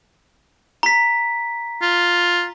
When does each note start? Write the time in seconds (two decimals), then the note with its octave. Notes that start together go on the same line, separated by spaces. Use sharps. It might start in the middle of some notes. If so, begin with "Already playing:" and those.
0.83 A#5 B6
1.82 F4